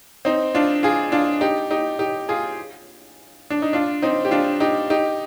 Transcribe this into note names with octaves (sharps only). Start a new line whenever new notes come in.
C4 D#4
D4 F4
F4 G#4
D4 F4
D#4 G4
D#4 G4
D#4 G4
F4 G#4
D4
D#4
D4 F4
C4 D#4
G4
D4 F4
D#4 G4
D#4 G4